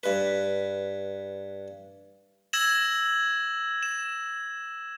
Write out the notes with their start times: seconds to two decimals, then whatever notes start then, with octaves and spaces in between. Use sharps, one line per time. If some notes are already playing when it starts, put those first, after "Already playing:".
0.03 G2 B4
2.53 E6 G#6 A#6 E7 F#7
3.83 E7